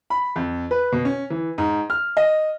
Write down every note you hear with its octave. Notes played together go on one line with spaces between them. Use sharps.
B5
F2
B4
B2
C#4
E3
G#2
F6
D#5